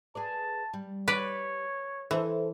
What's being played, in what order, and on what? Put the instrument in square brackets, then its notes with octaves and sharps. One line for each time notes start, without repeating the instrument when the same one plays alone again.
[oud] G#4 B4 D5 [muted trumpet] A5
[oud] G3
[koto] B4 D5 [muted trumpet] C#5
[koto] E3 [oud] A4 C5 E5